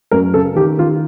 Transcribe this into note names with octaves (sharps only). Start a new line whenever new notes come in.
F#2 A#4
C#3 A4
D#3 G4
D#3 F4